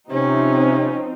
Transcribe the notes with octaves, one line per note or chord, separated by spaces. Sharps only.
C3 F3 C4 C#4 D#4